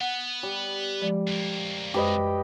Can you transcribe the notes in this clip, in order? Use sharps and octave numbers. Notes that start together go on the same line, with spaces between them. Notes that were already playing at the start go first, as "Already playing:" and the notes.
B3 F#5
G3
F3 G#3 D5
F2 A#3
F#2 G#3 G4 B4 C5 D#5